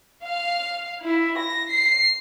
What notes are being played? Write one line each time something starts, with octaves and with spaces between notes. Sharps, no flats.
F5
E4
A#6
C7